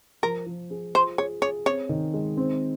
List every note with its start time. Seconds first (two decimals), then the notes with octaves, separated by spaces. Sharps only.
0.23 F3 A#4
0.46 F3
0.70 G#4
0.94 F4 C5
1.18 G#4 C#5
1.42 G#4 C#5
1.66 C4 C#5
1.89 D#3
2.14 G#3
2.37 C4